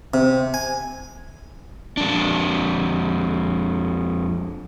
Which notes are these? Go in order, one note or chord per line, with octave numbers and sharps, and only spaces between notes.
C3
G#5
F2 D4